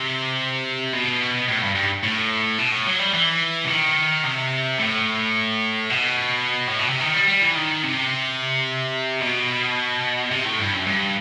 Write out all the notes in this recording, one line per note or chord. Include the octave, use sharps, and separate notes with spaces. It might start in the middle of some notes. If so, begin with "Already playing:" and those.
Already playing: C3
B2
A2
G2
G2
A2
B2
A2
F#3
G3
E3
C3
D#3
C3
A2
B2
A2
B2
C3
D#3
G3
G3
E3
D#3
C3
B2
C3
A2
G2
F#2
G2